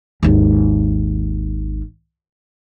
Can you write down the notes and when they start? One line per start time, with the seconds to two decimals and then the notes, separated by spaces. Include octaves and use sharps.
0.23 G#1 D#2